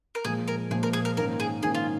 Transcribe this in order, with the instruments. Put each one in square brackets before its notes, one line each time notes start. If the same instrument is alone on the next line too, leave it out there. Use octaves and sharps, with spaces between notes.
[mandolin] A#4
[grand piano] A#2 F3 G#3 [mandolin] G#4
[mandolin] A#4
[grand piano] A#2 F3 G#3 [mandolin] G#4
[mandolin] A#4
G#4
A#4
[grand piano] G#2 D#3 A#3 C#4 [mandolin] A#4
[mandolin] G#4
[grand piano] G#2 D#3 A#3 C#4 [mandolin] G#4
[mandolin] F4